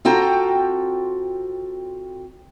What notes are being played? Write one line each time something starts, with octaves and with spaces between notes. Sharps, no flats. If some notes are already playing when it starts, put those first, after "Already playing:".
C4 F4 F#4 A4 G5 A#5